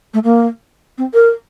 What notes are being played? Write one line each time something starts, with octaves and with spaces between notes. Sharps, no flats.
A3
A#3
C4
A#4